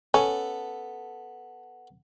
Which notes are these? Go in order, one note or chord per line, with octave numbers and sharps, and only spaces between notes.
B3 C#4 A4